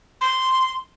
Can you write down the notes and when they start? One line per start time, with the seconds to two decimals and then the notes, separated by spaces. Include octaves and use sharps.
0.21 C6